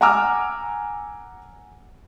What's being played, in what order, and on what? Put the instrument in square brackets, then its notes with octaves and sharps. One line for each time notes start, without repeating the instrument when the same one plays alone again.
[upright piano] F#5 G#5 A#5 D6 E6 F6